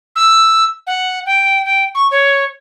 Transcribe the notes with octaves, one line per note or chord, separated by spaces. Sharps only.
E6
F#5
G5
G5
C#6
C#5